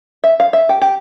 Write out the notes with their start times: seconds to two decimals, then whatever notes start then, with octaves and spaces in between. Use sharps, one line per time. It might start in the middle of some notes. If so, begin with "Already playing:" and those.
0.24 E5
0.40 F5
0.53 E5
0.69 G4
0.82 G4